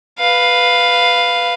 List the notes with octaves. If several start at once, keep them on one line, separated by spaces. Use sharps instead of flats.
B4 F5